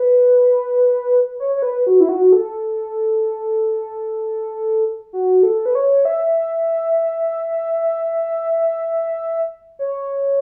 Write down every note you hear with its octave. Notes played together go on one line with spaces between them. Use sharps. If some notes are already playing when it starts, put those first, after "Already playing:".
Already playing: B4
C#5
C#5
B4
F#4
E4
F#4
A4
F#4
A4
B4
C#5
E5
C#5